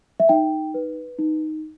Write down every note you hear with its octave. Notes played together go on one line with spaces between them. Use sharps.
E5
D#4 G5
B4
D#4